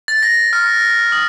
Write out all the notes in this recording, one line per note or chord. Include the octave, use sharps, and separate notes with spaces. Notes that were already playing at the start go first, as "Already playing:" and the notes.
A6
A#6
F6
D#6